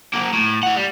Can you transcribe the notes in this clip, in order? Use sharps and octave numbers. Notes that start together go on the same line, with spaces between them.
F#3 A#3
A2
E4 F#5
G3